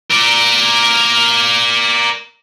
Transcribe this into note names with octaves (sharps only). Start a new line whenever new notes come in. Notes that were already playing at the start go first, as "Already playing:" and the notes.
A#4 D5